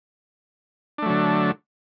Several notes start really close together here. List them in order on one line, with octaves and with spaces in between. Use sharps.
D4 A3 F#3 D3